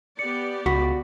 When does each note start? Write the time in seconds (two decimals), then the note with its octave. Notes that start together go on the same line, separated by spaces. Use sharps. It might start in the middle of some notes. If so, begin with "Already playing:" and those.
0.19 B3 G4 D5 C#7
0.66 C#2 F#4 B5 B6